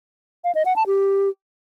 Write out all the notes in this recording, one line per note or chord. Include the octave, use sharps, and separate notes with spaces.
F5
D#5
F#5
A5
G4